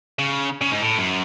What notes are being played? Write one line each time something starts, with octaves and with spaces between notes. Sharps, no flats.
C#3
C#3
G#2
A2
F#2